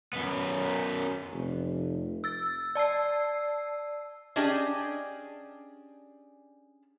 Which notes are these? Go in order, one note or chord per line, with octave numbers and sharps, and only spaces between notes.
F#2 B3
F1
E6 A6
D5 A5 E6 C7
C#4 D4 G4 G#4 D5 D#5